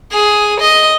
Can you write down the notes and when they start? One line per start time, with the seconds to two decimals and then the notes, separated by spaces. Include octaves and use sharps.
0.12 G#4
0.60 D#5